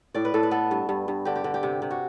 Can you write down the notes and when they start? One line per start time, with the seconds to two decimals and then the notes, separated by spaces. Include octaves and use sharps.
0.15 A2 D5
0.25 B4
0.34 A2 A4
0.43 B4
0.51 B3 A4
0.71 G2
0.89 G2
1.08 G2
1.25 D3 G4
1.35 G4
1.44 D3
1.54 G4
1.63 C3
1.82 C3
1.91 F#4